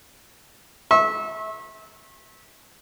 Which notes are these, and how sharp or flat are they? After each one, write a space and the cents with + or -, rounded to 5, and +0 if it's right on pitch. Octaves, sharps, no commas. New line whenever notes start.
E5 -25 C#6 -40